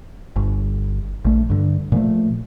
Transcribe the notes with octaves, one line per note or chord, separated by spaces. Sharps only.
G1
A#1 A3
G2 D3
A#2 F3 A3